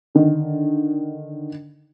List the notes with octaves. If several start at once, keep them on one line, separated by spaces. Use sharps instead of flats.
D3 D#3